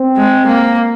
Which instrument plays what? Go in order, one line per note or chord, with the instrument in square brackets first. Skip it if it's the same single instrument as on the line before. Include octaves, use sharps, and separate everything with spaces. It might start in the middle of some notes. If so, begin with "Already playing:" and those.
Already playing: [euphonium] C4
[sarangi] G#3
A#3